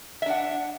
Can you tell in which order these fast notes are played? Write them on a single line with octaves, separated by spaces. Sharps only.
E5 D4 F#5